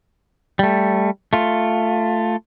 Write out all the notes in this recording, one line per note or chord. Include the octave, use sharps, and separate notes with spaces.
G3 A3
A3 F4